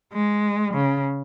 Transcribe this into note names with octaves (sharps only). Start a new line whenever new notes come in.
G#3
C#3